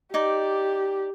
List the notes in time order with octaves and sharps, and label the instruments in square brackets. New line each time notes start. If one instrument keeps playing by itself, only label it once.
[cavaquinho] D#4 D5 [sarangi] G4